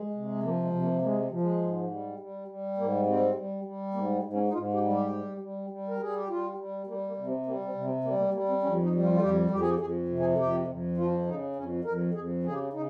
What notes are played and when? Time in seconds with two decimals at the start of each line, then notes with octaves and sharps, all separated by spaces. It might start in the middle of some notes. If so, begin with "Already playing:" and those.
Already playing: G#3
0.14 C3
0.43 F3 A#3
0.63 G#3
0.73 C3
0.82 A#3
1.01 G#3 A#3
1.21 G#3
1.30 F3
1.40 G#3
1.61 G#2
1.90 G3
2.19 G3
2.48 G3
2.77 G#2 A#3
3.06 G3 C4
3.35 G3
3.65 G3
3.94 G#2 A#3
4.15 G#3
4.23 G#2
4.33 C#4
4.48 D#4
4.53 G#2 F4
4.73 G4
4.82 G3
4.93 G4
5.12 G3
5.41 G3
5.70 G3
5.88 A#4
6.00 G3 G#4
6.15 G4
6.29 G3 F4
6.57 G3
6.87 G3 A#3
7.07 A#3
7.16 C3
7.27 C4
7.46 G3 A#3
7.65 C4
7.75 C3
7.85 C4
8.04 G3 A#3
8.18 A#3
8.33 G3 A#3
8.49 C4
8.62 F2 C#4
8.83 D#4
8.92 G3
9.02 F4
9.14 F4
9.21 F2 G4
9.50 F2 G4
9.60 G#4
9.70 G4
9.80 F2 G#4
10.09 C3
10.19 G#4
10.38 F2 G4
10.67 F2
10.97 F3 F4
11.26 C#3 D#4
11.56 F2 C#4
11.85 F2 A#4
12.14 F2 G#4
12.43 C#3 G#4
12.53 G4
12.73 C#3 D#4